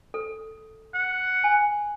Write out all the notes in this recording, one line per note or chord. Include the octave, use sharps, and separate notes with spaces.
A4
F#5
G#5